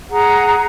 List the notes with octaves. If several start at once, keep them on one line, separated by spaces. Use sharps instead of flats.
G#4 F#5 A#5